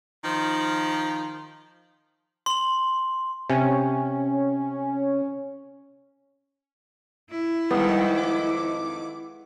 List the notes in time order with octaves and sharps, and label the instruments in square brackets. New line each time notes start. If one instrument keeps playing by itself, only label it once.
[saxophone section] D#3 F3
[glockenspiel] C6 F#7
[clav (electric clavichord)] C3 [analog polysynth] C#4
[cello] E4
[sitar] F2 D#3 [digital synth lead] G3 [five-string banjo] G#3 B3
[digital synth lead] D6